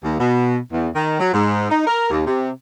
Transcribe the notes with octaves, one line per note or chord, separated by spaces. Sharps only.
D#2
B2
E2
D#3
F#3
G#2
D#4
A#4
D#2
C3